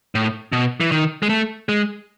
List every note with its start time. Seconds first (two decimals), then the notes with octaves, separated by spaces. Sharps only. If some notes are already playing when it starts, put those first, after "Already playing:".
0.15 A2
0.52 B2
0.80 E3
0.92 D#3
1.23 G#3
1.29 A3
1.69 G#3